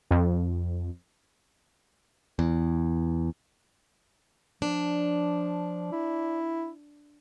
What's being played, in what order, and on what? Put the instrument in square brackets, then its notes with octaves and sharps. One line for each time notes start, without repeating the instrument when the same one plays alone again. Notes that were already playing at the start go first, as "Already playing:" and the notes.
[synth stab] F2
[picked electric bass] E2
[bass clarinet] F3 [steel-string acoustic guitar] D4
[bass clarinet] E4